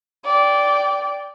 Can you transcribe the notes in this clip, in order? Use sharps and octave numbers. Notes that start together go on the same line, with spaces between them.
D5 G5